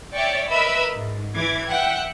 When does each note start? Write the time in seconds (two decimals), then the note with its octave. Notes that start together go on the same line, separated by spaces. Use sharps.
0.14 C#5 D5 E5 G5 C#6
0.49 A#4 B4 D#5 E5 B5 E6
0.95 G#2
1.36 E3 D6 G#6
1.69 E5 F#5 G5